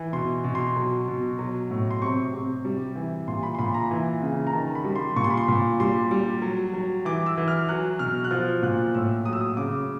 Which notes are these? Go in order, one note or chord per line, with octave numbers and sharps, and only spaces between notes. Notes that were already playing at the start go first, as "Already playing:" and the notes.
Already playing: E3
B2 C6
B2
C6
F#3
B2
F#3
A2
C6
C3 C#6
C3
G3
E3
A#2 C6
B5
C6
A#2 B5
A#5
E3
C#3
A#5
D#3 A5
B5
G3
C6
A#2 C#6
C6
B5
C6
A#2
G3 C6
G3
F#3
F#3
E3 D6
E6
E3
F6
F#3 F#6
B2 F6
F#6
F3 F6
A#2 F#6
A2 E6
F#3 D#6
E6
D#6
C#3 D6